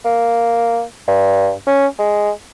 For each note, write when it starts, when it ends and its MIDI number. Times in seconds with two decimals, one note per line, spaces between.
0.05 0.82 58
1.08 1.52 43
1.67 1.86 61
1.99 2.31 56